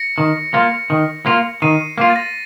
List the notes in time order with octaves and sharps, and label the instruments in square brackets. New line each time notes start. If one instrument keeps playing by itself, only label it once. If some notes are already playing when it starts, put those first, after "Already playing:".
Already playing: [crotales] A#6 C#7
[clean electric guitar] D#3
A#3 F4
D#3
A#3 F4
[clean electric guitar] D#3 [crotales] C7 D#7
[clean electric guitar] A#3 F4 [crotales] C7
[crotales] A6
A#6